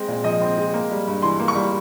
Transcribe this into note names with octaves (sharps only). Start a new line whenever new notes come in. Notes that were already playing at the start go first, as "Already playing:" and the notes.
Already playing: G#3 C4
A#2
F3 D#5
C4
G#3
A#3
G3
G2
E3 C6
A#3
C#6
G3